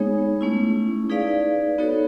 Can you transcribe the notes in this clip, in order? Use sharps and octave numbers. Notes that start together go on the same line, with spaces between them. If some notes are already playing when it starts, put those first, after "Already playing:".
Already playing: G#3 B3 D#4 G#4 C#5
A3 C#4 E4
D#4 G#4 B4 D5 F5
B3 D#4 F#4 A4 C#5